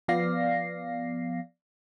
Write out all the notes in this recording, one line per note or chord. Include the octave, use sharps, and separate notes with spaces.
F3 B3 D5 F5 A#6 C7